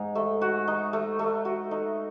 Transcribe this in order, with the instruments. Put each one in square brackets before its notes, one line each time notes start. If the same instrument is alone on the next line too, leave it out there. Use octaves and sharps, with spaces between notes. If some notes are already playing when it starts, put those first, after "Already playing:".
Already playing: [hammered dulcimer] G#2 [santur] D#4
[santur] A3
F#4
D#4
A3
A3
F#4
D#4